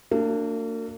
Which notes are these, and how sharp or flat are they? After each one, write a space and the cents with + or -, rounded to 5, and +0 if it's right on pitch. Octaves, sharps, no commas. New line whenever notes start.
A#3 -40 D4 +0 F#4 -20